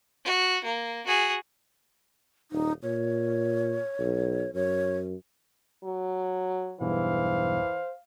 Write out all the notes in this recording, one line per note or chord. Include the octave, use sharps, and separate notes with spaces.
F#4
A#3
F#4 G#4
D#1 D#4
A#2 C#5
B1
F#2 C#5
F#3
B1 E2 G2 E3 C5 F5